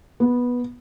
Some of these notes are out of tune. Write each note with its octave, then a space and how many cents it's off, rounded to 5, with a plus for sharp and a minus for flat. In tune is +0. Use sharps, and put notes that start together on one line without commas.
B3 -10